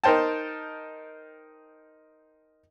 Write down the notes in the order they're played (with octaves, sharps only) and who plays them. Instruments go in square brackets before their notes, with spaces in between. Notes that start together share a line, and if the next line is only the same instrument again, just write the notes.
[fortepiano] D#4 A#4 C5 G5 A5